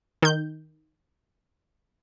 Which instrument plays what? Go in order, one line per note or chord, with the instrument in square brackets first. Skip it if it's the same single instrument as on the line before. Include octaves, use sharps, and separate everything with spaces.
[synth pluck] D#3 G6